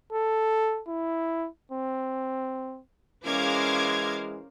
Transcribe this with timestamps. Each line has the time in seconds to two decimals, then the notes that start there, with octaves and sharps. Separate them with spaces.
0.13 A4
0.89 E4
1.72 C4
3.25 E3 G#3 C#4 A#4 C5 F5 D6 G#6